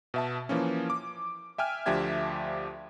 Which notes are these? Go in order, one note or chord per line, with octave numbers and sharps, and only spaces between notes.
B2 E5 A5
E3 F3 A#3 C#4
D6
E5 G5 G#5 F6
D2 F3 D4 G4 E5 G#6